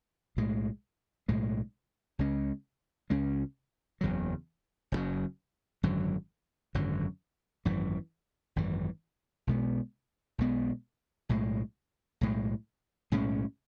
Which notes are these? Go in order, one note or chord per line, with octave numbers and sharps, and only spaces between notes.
B1 A2 G#3
B1 A2 G#3
C#2 C#3 G#3 C#4
C#2 C#3 G#3 C#4
F#1 E2 C#3 F#3
F#1 E2 C#3 F#3
G#1 F#2 D3 F#3
G#1 F#2 D3 F#3
G#1 F#2 E3
G#1 F#2 E3
B1 B2 G#3 B3
B1 B2 G#3 B3
B1 A2 G#3
B1 A2 G#3
B1 A2 G#3 C#4